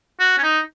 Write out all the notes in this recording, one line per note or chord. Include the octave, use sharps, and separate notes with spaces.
F#4
C#4
D#4